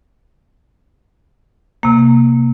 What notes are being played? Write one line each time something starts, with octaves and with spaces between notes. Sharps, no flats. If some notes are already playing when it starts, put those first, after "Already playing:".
C3 A#3